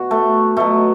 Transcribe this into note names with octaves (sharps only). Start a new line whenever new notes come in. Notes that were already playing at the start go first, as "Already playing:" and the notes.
Already playing: B2 F#3 F#4
A3
B2 F#3 A3